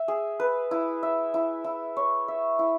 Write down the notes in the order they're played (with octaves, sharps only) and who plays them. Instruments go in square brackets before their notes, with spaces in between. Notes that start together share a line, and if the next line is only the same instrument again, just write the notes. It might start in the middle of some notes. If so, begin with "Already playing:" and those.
Already playing: [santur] E5
G#4
B4
E4
E5
E4
E4
C#5
E5
E4